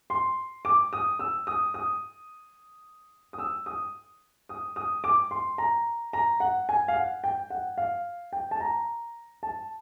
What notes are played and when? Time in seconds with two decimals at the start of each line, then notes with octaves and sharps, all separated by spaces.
0.10 C6
0.65 D6
0.93 D#6
1.19 E6
1.47 D#6
1.74 D#6
3.33 D#6
3.39 E6
3.66 D#6
4.49 D#6
4.76 D#6
5.04 D6
5.31 C6
5.58 A#5
6.13 A#5
6.40 F#5
6.69 G#5
6.88 F5
6.96 F#5
7.24 G5
7.50 F#5
7.78 F5
8.33 G5
8.51 A5
8.60 A#5
9.43 A5